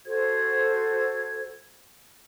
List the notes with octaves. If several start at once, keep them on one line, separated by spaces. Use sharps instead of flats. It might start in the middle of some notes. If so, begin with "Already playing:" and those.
F#4 A4 C5 G#6